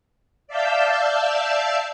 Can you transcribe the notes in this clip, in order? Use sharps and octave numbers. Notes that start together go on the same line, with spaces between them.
D5 E5 F5 A5 E6 G6